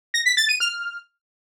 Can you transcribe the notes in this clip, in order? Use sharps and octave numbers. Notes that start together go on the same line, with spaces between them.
A#6
B6
A6
D#7
F6